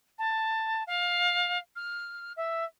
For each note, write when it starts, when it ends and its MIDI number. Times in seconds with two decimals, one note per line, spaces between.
0.18 0.83 81
0.87 1.58 77
1.76 2.32 89
2.36 2.64 76